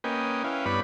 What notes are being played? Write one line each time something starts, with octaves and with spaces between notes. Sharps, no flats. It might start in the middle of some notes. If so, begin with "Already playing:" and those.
A#3 C#4 B4 D#5 G5 G#5
C#4 E4 B4 F5 G5
G2 B3 B4 C#5 D5 B5